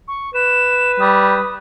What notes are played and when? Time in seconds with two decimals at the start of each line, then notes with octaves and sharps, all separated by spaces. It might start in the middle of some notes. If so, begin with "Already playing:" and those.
0.08 C#6
0.34 B4 E7
1.00 G3 D#6